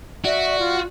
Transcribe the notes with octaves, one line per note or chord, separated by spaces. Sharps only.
F#4 D5 E5
F4